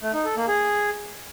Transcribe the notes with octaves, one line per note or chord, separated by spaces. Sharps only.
A3
D#4
A4
A#3
G#4